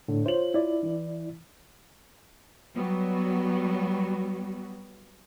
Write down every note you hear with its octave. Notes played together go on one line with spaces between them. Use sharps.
A2 D3
F4 C5 C#5 F#7
E4 D5
E3
F#3 G3 B3 F#4